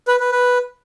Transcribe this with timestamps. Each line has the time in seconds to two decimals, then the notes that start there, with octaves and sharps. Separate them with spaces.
0.08 B4
0.20 B4
0.32 B4